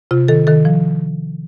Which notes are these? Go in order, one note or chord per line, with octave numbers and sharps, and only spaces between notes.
C3 F4
D#3 A4
D#3 A4
F3